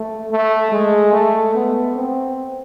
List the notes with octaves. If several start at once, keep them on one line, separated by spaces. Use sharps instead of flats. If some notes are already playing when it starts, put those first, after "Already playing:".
Already playing: A3
A3
G#3
A3
B3
C4